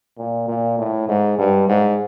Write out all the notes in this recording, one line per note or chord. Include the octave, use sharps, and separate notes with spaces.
A#2
A#2
A2
G#2
G2
G#2